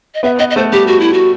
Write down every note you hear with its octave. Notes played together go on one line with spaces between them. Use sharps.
D#5
B3 E5
B3 D#5
D#5
A3 C5
G3 G4
F#4
E4
F#4